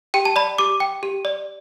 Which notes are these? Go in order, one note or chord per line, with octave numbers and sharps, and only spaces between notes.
G4 G5
A5
D5 B5
G4 D6
G5
G4
D5